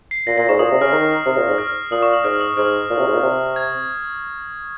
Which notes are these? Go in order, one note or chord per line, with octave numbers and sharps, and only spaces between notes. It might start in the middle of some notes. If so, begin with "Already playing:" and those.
C7
A#2 A#6
A#2 A#6
G#2 C#6
A#2 D#6
C3
C#3 F6
D#3
C3
A#2
G#2
F6
A#2 D#6
C#6
D#6
G#2 F6
D#6
G#2 F6
A#2
C3
G#2
A#2
C3
G#6